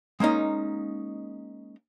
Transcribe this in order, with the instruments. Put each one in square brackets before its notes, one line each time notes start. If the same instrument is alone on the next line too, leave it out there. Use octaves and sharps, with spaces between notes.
[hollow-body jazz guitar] G#3 A#3 C#4 D#4